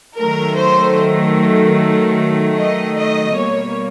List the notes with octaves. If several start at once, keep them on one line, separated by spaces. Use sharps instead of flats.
D#3 F#3 A3 A#4
C5
D#5
D#5
B2 G3 A#3 C#5